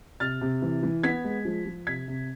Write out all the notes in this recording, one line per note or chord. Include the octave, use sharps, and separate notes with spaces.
C3 F6 A6
C3
E3
E3
B3 G#6 B6
G#3
F3
F3
C3 G#6 B6
C3